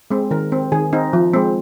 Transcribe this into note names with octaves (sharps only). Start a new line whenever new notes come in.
G#3 C4
D#3 A#4
C4
D#3 G#4
C4 D#4
F3
G#3 C4